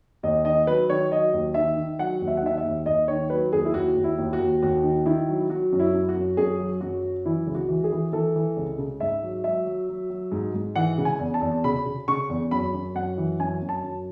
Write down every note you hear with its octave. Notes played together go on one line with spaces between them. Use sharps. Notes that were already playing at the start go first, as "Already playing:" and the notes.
D#2 D#5
D#3 D#5
F#3 B4
D#3 C#5
F#3 D#5
D#2
D#3 E5
D#3
F#3 F#5
D#2
E5
F#5
D#3 E5
E5
D#2
D#2 D#5
D#3 C#5
F#3 B4
D#2 G#4
E4
D#2 F#4
D#2
E4
D#2
F#4
D#2
D#2 F#4
D#3
D#3 E4
F#3
F#3 F#4
F#2
E4
F#2
F#4
F#2
F#2 G#4
F#3
F#2 F#4
F#3
E3 E4
C#2
F#4
E3
G#4
E3
E3 A4
E3
C#2
C#3
G#2 E5
F#3
F#3 E5
F#3
F#3
F#3
G#2
G#2
E3 F#5
C#3
G#5
E2
A5
E2
C#3 B5
C#3
C#3 C#6
E2
F#2 B5
F#2
F#2 F#5
E3
F#2 G#5
F#2
A5
F#2